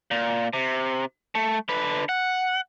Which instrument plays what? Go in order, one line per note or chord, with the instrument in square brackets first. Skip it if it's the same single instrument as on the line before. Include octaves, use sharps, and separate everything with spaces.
[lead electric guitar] A#2
C3
A3
D3 B4
F#5